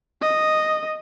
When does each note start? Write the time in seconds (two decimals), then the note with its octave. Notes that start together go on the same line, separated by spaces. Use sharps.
0.22 D#5